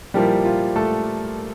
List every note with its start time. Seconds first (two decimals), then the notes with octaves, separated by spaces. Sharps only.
0.14 A#2 F3 G3 A#3 E4 G4
0.45 F4
0.76 A3 A4